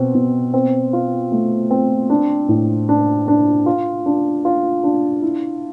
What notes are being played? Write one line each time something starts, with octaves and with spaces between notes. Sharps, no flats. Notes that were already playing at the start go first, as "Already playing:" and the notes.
Already playing: B2 C4
B2
C4
F4
A3
C4
D4
A2
D4
D4
F4
D4
F4
D4
E4